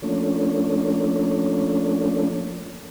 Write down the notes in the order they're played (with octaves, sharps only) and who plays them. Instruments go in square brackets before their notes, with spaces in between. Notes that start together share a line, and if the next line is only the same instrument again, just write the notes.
[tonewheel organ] F3 A3 A#3 C#4 D4